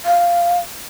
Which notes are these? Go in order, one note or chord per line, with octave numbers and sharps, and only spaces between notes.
F5